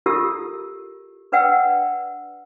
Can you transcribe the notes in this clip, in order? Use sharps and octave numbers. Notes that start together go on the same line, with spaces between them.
E4 F4 G4 A4 A#4 E6
D4 B4 D5 F#5 G5 E6